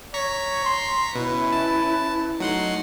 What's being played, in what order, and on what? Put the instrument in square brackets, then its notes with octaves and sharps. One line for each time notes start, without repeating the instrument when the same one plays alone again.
[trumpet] C#5 [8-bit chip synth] A#5 C#6 B6
[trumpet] C6
[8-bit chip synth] B2 [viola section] C#4 E4 [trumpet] B4
[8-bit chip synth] A5
[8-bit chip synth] F#3 F#5 C6 [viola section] A3 D#4